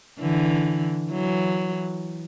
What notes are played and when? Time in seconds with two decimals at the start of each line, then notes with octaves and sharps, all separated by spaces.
0.20 D3 E3
1.11 E3 F#3